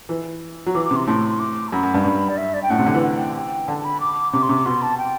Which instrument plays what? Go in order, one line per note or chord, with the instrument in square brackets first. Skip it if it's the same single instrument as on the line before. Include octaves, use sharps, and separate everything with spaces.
[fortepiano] E3
F#3
[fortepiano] E3 [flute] D6
[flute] D6
[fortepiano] C3
[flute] C6
[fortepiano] A2 [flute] C6
[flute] C6
D6
A5
[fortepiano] F#2 [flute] B5
[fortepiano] F#2
G2
G2
[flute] D5
E5
D5
G5
[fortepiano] A2 [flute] F#5
[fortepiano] C3
D3
E3
[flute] F#5
F#5
G5
G5
[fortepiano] D3 [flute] A5
[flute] A5
B5
D6
[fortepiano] C3 [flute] D6
[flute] C6
[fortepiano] C3 [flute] D6
[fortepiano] B2 [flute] C6
[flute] A5
G5